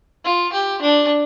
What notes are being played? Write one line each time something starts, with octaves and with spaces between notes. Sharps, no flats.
F4
G4
D4